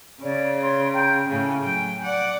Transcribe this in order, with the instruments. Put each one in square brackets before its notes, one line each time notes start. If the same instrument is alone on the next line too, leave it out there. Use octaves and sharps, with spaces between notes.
[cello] C#3 [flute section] C#5 D5
[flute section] C#5 C6
G5 A#5 G6
[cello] A2 C#3 [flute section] G#5
[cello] F#3 G5
D5 F#5